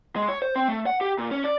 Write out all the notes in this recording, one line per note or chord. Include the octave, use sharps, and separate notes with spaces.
G#3
C#5
C5
C4
A3
F#5
G4
A#2
C#4
D5